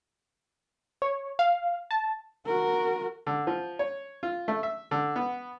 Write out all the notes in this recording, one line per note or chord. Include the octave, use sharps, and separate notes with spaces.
C#5
F5
A5
F#4 A#4
D3
F3
C#5
F4
A3
E5
D3
B3